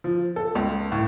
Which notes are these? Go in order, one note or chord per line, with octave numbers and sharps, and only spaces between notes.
F3
A4
C#2
A2